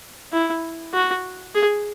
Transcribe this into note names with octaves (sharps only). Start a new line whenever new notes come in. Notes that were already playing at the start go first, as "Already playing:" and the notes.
E4
F#4
G#4